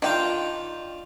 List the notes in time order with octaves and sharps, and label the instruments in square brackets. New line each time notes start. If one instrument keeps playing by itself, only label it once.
[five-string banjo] D#3 G5 [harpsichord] D4 F4